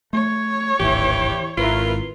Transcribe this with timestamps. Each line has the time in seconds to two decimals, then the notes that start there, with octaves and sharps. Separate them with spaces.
0.13 A3 C#5
0.80 D1 G#1 E3 E4 G4
1.57 G#1 E4 F4 A#4 B4